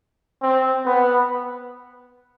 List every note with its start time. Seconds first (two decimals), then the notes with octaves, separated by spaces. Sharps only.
0.42 C4
0.85 B3